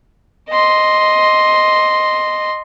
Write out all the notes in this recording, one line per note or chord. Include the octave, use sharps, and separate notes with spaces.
D#5 C6